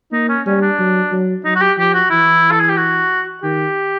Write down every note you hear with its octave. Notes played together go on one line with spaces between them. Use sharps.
A#3 D#4
C#4
G3 C#4
D4
F#3
F#3
F#3 D#4
F#4
G4
F3 G4
F#4
E3 E4
A4
G#4
G4
F#4
D#3 G4